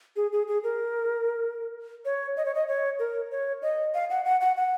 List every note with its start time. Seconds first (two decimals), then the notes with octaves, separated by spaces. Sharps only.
0.16 G#4
0.32 G#4
0.47 G#4
0.64 A#4
2.05 C#5
2.37 D#5
2.45 C#5
2.55 D#5
2.68 C#5
2.99 A#4
3.31 C#5
3.62 D#5
3.94 F5
4.10 F#5
4.25 F#5
4.41 F#5
4.57 F#5